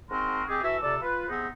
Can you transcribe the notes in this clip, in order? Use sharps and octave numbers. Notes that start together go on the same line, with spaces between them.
G#2 C4 F#4 A#4 C6
G#3 C4 G4 G#4
E3 F#4 A4 E5
F2 C3 A4 D5
F4 B4
C3 B3 C4 D#4 G#4